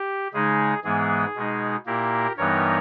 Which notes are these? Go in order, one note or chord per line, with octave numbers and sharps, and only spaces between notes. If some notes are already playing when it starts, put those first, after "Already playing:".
Already playing: G4
C#3 G#3 D#4 G#4
G#2 E3 G#3 B3 G#4
B2 G#3 D#4
A#2 A#3 E4 G4 A#4
G2 E3 G3 B3 D#4 A#4 C#5